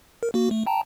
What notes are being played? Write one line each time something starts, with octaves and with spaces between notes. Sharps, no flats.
A#4
A#3 F#4
A3
G5 A5 A#5